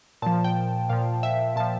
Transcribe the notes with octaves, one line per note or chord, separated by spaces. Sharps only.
A#2 F3 A5
G5
A#2 F3 F5
E5
A#2 F3 A5